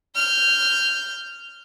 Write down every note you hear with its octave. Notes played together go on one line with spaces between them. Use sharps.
F6 G6